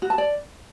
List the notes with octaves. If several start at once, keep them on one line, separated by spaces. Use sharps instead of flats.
F#4
A5
D5